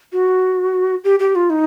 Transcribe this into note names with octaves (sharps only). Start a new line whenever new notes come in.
F#4
G4
G4
F4
D#4